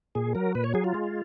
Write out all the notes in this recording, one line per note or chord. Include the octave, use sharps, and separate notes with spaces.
A#2 G#4
F#3 A#4
A#2 B4
C#5
F#3 G#4
F4
G#3